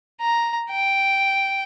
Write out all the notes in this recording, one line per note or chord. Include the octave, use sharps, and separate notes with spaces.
A#5
G5